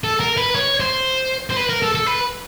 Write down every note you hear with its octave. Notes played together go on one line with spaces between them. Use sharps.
A4
A#4
B4
C#5
C5
C5
B4
A#4
A4
A4
B4